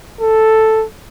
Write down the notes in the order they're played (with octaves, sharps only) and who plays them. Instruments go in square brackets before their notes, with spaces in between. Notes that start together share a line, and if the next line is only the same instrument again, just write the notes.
[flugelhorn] A4